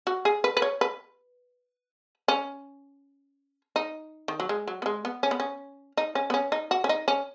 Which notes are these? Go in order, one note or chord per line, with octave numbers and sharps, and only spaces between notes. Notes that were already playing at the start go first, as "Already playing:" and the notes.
F#4
G#4
B4
B4
C#5
B4
C#4
D#4
D#3
F#3
G#3
F#3
B3
G#3
B3
C#4
B3
C#4
D#4
C#4
B3
C#4
D#4
F#4
C#4
D#4
C#4